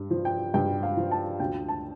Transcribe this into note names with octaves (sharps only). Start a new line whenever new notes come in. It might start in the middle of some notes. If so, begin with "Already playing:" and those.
Already playing: G2
F3
G5
G2 G5
F5
F3
A5
D2 G5
A5